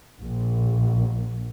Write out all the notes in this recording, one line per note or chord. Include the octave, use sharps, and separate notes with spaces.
A#1